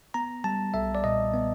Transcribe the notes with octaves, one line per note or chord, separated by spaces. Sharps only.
B3 A#5
G3 A5
B1 E5
D5
A#2 D#5
B3